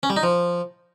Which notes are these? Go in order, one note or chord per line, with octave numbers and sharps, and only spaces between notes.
C#4
G3
D#4
F3